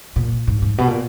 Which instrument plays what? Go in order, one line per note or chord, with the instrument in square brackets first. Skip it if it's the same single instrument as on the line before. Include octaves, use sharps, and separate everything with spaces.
[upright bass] A#2
G#2
G#2
B2
A#2